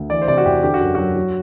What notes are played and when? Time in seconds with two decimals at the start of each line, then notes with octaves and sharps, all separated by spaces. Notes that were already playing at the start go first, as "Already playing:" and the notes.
Already playing: D2
0.10 E3 D5
0.22 C5
0.28 C3 D5
0.38 F#4
0.45 E2 G4
0.63 D3 G4
0.74 F#4
0.81 F#2
0.95 F#3 F#4
1.16 F#3